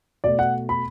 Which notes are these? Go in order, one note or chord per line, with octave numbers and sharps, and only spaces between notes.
B2 A3 D5
F#5
B5